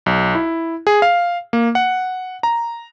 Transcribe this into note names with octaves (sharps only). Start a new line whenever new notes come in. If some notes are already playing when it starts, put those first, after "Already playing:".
B1
E4
G#4
F5
A#3
F#5
A#5